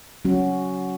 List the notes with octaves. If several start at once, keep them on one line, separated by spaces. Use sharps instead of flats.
F#3 C#4 F#4